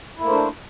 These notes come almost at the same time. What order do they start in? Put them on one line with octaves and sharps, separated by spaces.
E4 A#3 A3 C5 D4